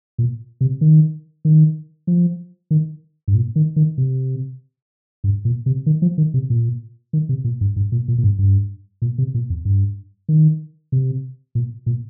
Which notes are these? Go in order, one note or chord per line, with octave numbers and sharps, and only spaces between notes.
A#2
C3
D#3
D#3
F3
D#3
G2
A#2
D#3
D#3
C3
G2
A#2
C3
D#3
F3
D#3
C3
A#2
D#3
C3
A#2
G2
G2
A#2
A#2
A#2
G2
G2
A#2
C3
A#2
F2
G2
D#3
C3
A#2
A#2